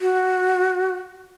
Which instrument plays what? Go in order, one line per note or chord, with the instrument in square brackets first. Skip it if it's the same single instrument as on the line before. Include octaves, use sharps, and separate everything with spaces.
[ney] F#4